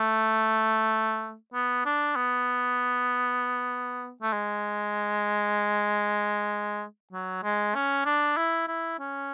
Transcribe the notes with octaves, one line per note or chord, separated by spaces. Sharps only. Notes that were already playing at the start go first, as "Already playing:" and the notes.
Already playing: A3
B3
D4
B3
A3
G#3
F#3
G#3
C#4
D4
E4
E4
C#4